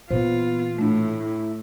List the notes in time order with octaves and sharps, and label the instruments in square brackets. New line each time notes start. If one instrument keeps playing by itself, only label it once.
[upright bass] A#2 E3 [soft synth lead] B3 [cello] F4 [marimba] C5
[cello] A2 [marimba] A3 D4 [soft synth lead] E4